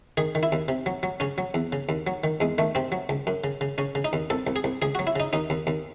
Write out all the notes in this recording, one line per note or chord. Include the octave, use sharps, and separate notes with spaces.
D#3 G#4
D#3
E4
D#2
C3
F#3
F#3
C#3 C#4
F#3
E2
C#3
D#2
F#3
D#3
E2 G#3
D#3 A3
C3 C4
F#3
C#2
F#2
C#3
C#3
C#3 C#4
C#3
D#4
D#2
C2 A4
C2
G#4
C2
C#2 G#4
F#3 F#4
E4
C#3 D#4
D#2 D#4
D#2
D#2